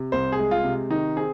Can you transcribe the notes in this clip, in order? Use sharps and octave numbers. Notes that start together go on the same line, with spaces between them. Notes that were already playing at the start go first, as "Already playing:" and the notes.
Already playing: C3
C2 C5
G#4
G#3
F4
C3
D#3 D#4
C4 G#4